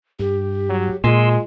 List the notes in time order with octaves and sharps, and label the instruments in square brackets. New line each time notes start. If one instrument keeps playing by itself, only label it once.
[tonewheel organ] G2 [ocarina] G4
[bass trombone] F#3
[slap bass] A#2 [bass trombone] G#3 [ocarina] F4 [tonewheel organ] G#5 C6 E6